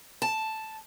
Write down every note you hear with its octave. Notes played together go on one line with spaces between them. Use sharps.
A5